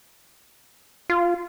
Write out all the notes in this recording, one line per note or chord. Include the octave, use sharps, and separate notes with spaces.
F4